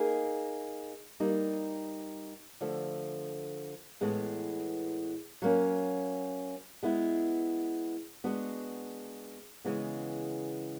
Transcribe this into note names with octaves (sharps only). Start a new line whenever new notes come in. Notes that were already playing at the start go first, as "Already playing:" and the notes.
Already playing: A#3 D#4 G#4
G3 A#3 D#4
D3 F3 A3
A2 E3 G#3 B3
F#3 A#3 C#4
G#3 B3 E4
G#3 B3 D4 F#4
C#3 E3 G#3 B3